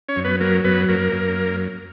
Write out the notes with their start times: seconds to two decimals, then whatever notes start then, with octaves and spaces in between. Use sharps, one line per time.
0.09 C#4 C#5
0.16 F#2
0.25 B3 B4
0.40 F#3 A#3 A#4
0.64 F#2 B3 B4
0.89 F#2 A#3 A#4
1.13 F#2